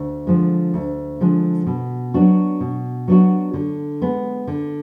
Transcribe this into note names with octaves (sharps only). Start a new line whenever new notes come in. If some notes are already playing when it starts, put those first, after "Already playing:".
Already playing: D2
D3 F3 G#3
D2
D3 F3 G#3
B2
F#3 B3 D4 F#4
B2
F#3 B3 D4 F#4
D3
G#3 B3
D3